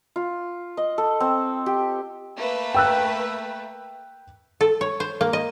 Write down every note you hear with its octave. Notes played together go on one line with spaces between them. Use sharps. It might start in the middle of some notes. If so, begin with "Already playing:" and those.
F4
D#5
A4
C4
G4
A3 A#3 B4
G5 E6 F#6
A4
C#5
C5
A#3
D#5